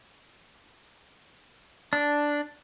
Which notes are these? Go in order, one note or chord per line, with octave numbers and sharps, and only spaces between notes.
D4